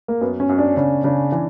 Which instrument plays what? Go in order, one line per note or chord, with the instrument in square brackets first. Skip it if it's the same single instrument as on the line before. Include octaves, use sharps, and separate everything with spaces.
[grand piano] A#3
[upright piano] F#2 [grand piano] B3
[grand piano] C#4
[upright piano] F#2
[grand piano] D4
[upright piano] C#3 [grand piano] C#4
[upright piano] C#3 [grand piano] D4
[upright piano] E3